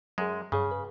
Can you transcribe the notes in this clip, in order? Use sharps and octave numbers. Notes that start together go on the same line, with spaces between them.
F#2 F#3 G#3 G#4
G2 C#3 G#4 C#5
B4